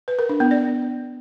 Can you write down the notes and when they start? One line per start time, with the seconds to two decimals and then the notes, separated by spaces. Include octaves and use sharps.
0.08 B4
0.19 A#4
0.29 D4
0.40 B3
0.51 D5